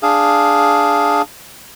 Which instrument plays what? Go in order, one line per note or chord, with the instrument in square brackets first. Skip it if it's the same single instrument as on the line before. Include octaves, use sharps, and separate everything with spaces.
[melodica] D4 G#4 F5